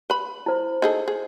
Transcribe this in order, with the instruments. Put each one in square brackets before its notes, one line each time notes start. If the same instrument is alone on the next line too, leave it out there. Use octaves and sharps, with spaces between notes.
[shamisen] B4 B5
[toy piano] E4 C5
[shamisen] D#4 G#4 A4
G#4